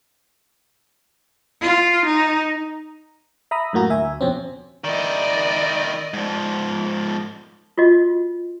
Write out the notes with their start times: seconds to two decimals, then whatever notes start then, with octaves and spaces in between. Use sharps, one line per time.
1.61 F4
2.06 D#4
3.51 E5 A#5 B5 D#6
3.73 F#2 A2 A#3 F#4 A#5 A#6
3.90 D2 E5 G#5
4.21 F2 B2 C4 C#4
4.84 D#3 E4 D5 D#5
6.13 G#2 F3
7.78 F4 F#4 D#5